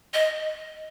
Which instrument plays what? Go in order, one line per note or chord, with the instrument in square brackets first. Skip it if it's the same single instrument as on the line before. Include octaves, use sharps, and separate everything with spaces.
[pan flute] D#5